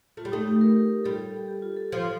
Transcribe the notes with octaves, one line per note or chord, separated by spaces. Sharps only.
A3 F4
G3
A3 D#4
G4
A#4
G3 A4
G4
F4
A4
F3 A4